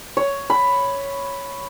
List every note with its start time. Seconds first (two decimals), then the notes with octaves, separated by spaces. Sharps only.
0.17 C#5
0.50 B5